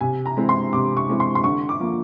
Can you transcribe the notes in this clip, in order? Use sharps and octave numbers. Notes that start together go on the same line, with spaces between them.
C3 G#5
A#5
E3 G#3 C4 E4
C6
C3 D6
C#6
E3 G#3 C4 E4
C6
C6
D3 C#6
D6
F3 A#3